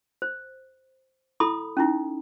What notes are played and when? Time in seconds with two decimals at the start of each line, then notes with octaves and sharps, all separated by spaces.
0.22 C5
1.40 E4 A4 B5 D#6
1.77 C#4 D#4 E4